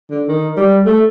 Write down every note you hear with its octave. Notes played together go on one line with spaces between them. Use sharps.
D3
D#3
G3
A3